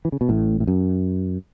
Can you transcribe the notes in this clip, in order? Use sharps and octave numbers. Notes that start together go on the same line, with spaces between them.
E3
C#3
B2
A1 A2
A2
F#2